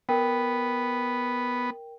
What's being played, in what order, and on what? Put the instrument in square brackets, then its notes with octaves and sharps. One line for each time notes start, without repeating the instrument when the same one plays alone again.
[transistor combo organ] B3 [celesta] A#4 G5